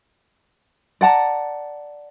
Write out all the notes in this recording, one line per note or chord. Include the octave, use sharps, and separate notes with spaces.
D5 F#5 A5 A#5